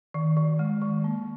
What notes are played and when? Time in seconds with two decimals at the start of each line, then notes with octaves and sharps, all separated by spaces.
0.14 D#3
0.37 D#3
0.59 G#3
0.82 D#3
1.04 A#3